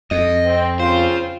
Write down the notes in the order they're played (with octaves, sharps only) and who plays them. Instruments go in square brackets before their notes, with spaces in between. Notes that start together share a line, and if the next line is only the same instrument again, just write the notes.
[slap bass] F2 [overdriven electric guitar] D#5
[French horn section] C4
[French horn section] C#3 C4 F4 [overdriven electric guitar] C5